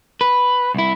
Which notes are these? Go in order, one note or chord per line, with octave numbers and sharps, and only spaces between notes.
B4
C2 E4